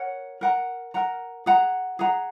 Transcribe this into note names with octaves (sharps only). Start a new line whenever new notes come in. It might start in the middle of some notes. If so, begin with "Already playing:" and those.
Already playing: A#4 C#5 F#5
A#4 F#5 A#5
A#4 F#5 A#5
G#4 F#5 A#5
G#4 F#5 A#5